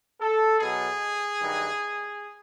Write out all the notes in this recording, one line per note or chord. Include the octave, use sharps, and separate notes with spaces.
A4
B2 F#3 G#4
G2 D#3 F#3